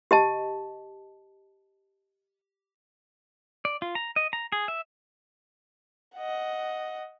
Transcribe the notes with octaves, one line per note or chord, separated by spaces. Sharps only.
G4 D#5 A5
D5
F4
A#5
D#5
A#5
G#4
E5
D#5 F#5